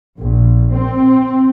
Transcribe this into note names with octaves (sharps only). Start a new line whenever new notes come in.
A#1
C4